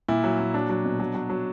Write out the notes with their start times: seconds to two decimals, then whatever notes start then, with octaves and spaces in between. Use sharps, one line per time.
0.08 A#2 E4
0.24 F#3
0.40 A#2
0.54 F#3 D4
0.69 F#3
0.85 B2
1.00 F#3
1.15 F#3
1.30 F#3